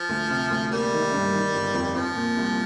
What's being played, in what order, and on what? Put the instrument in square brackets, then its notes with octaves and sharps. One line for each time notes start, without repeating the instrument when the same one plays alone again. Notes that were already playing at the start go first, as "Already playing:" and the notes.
Already playing: [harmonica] F3
[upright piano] D2
C3
D2
[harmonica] G3 [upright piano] A#3
[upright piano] D#3
G2
D#3
G1
F2
[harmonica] F3 [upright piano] C4
[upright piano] A#2
C2